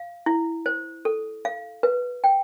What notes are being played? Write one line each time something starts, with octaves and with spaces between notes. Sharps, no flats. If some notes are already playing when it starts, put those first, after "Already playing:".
Already playing: F5
E4
C5
A4
F5
B4
G5